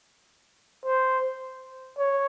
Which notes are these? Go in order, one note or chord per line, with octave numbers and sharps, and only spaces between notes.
C5
C#5